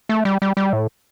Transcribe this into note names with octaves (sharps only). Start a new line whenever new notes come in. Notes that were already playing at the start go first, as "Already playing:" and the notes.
A3
G3
G3
G3
A2